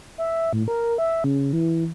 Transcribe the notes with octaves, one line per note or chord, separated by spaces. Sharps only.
E5
A2
A#4
E5
C#3
E3